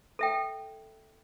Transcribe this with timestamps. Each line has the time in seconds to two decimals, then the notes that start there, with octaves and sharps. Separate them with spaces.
0.19 A4 E5 G5